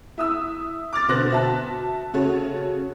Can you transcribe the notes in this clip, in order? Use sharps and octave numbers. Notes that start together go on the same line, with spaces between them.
E4 D#6 E6
D6 F6 A6
B2 D3 B3 C5 F#6 A#6
F#4 E5 A5
C#3 F#4 A4 C#5